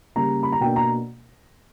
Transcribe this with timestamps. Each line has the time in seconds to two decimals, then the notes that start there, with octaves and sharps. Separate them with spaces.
0.16 C#3 G3 A#3 A#5
0.43 B5
0.52 A#5
0.60 B2 A#3 D4 G5
0.76 A#5